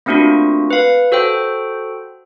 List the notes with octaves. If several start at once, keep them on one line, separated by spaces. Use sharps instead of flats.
A3 A#3 C4 D4 F4 F#4
B4 F5
F#4 A4 C5 G5